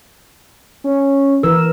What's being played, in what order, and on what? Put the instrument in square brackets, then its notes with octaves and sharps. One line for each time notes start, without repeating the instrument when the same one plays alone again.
[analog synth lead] C#4
[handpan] E3 A#4 [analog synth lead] E6